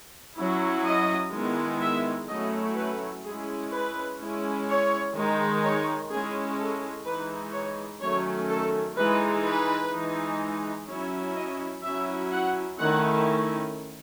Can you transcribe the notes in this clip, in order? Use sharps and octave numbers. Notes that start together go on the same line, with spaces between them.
F#3 C#4 E4
D#5
D#3 G#3 B3 E4
E5
F#3 A3 C#4 E4 D#5
B4
G#3 C#4 E4 G#4
B4
G#3 C#4 E4
C#5
D#3 G#3 D#4
C#5
G#3 C#4 E4 G#4
A4
E3 G#3 D#4 B4
C#5
D#3 F#3 A3 C#4 C#5
A4
E3 G#3 D#4 B4
B4
E3 G#3 D#4
F#3 C#4 E4 C#5
D#5
F#3 C#4 E4 E5
F#5
D#3 A3 C#4 E4 F#5